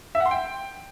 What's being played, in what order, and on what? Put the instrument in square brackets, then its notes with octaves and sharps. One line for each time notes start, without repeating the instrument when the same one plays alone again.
[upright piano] E5
F#5
C6
G5